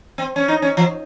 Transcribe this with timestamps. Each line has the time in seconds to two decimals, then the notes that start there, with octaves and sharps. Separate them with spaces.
0.18 C4
0.36 C#4
0.48 D#4
0.62 C#4
0.77 F3